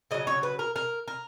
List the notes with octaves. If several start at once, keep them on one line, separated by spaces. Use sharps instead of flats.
C#3 F#3 D#5
C#5
B4
A#4
A#4
A#4